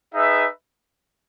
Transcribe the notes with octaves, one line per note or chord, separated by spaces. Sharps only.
D#4 G#4 B4 E5